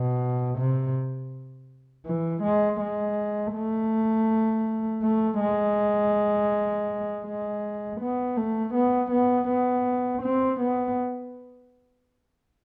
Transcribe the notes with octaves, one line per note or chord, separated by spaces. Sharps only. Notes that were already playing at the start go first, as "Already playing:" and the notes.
Already playing: B2
C3
E3
G#3
G#3
A3
A3
G#3
G#3
B3
A3
B3
B3
B3
C4
B3